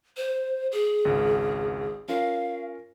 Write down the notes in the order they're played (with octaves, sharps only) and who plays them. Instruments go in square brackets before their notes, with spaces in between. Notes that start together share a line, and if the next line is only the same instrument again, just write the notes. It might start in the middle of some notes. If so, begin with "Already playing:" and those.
[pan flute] C5
G#4
[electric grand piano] G#1 C#2
[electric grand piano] C#4 F4 A#4 [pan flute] F5